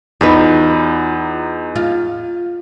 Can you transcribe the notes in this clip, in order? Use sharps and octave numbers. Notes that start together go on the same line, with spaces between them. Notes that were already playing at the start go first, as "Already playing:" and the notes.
E2 D#4 F4 F#4 B4
F4